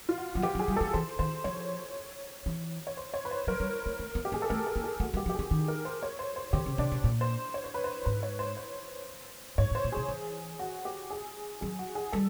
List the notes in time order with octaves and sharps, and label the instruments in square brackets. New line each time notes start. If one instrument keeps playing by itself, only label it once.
[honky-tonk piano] F4
F#4
[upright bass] F#3 [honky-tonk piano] F#4
[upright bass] F3 [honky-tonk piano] G4
[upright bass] F#3
[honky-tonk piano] G#4
[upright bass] G3
[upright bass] G#3 [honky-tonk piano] A4
[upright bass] E3 [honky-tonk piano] C5
[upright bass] D#3 [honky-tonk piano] C5
[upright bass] F3 [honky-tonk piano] C#5
[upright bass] E3
[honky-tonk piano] C#5
C5
C#5
B4
C5
[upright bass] F#3 [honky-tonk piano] A#4
[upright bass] G3
A3
A3
B3
[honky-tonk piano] G4
[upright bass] A#3 [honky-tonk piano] G#4
[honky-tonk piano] A4
[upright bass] A3 [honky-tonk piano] A#4
[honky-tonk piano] A4
[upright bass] A#3
[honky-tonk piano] G#4
[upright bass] A3 [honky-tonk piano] F#4
[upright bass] G#3
[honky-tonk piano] G4
[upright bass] F3
[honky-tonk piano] G4
[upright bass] E3 [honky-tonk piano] G#4
[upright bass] D#3
[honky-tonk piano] A#4
C5
C#5
C5
C5
[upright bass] D3 [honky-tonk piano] G4
[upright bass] C#3
[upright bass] C3 [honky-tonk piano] D4
[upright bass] B2
A#2
[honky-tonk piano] C5
C#5
C5
B4
C5
[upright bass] G#2 [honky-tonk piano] B4
[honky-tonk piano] C#5
C5
C5
[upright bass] G#2 [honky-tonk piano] C#5
[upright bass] A2
[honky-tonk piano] C5
[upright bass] A#2
[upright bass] B2 [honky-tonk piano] G#4
[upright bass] E3
[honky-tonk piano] F#4
G4
G#4
[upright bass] F#3 [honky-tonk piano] G#4
[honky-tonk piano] F#4
G#4
[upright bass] G3 [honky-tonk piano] A4